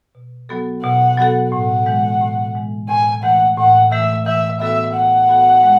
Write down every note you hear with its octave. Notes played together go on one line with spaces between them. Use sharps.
B2
F#3 B3 F#4 A4
B2 F#5
F#3 B3 F#4 A4
A2 F#5
E3 G#3
A2
E3 G#3
A2 G#5
E3 A3 F#5
A2 F#5
E3 A3 E5
E3 E5
B3 F#4 A4 E5
E3 F#5
B3 F#4 A4
G#3